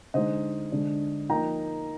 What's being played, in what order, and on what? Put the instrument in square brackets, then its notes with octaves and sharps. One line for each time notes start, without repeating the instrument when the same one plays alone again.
[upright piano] D3 G#3 D#4 C5 D#5
D3 G#3 D4
F3 A#3 D#4 G5 A#5